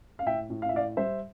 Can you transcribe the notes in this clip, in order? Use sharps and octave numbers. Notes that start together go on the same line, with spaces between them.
F5
A2 E5 G5
A2
F5
E5
A2 D5 F5
G3 C5 E5